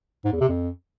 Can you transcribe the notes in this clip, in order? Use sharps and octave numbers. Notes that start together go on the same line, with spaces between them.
G#2
E2
C3
F2